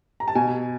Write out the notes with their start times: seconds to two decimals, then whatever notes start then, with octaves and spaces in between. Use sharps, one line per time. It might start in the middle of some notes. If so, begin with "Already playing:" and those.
0.20 A#5
0.28 A5
0.35 B2 G#5